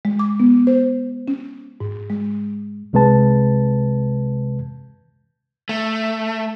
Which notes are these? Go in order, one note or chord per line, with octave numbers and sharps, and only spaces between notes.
G#3
D6
B3
C5
C#4
G#2
G#3
C2 C3 G#3 B4 A5
A3